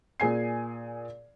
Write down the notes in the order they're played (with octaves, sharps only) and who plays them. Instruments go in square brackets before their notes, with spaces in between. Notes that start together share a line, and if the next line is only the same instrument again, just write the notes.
[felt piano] A#2 G#4 G#5 C7